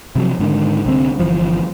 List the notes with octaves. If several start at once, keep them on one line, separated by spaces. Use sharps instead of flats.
C3 F3 F#3
G#2 D3 D#3
C2 D3 C4
G1 D#2 E3 F3